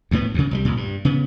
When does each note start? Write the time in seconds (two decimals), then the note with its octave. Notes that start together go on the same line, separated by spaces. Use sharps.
0.11 D2 A2 B3
0.34 D2 C#3
0.51 C2 F#3 G3
0.65 C2 A#2
0.77 G2
1.05 C#3 B3